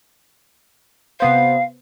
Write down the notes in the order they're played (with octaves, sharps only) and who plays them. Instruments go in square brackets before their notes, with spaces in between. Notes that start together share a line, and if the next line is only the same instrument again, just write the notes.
[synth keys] C3 B3 C5 [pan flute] F5